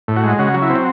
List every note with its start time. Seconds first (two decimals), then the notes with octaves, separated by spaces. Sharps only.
0.08 A2
0.16 F#4
0.24 G#3
0.39 C#3 F#4
0.54 F#3
0.62 E4
0.70 C4